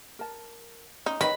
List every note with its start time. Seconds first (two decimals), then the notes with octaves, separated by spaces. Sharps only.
0.19 A#4 A5
1.06 C#4 D#4 G#5
1.21 D#3 B4 C#5 D#5 B5